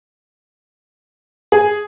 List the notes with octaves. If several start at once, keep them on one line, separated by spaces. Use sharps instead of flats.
G#4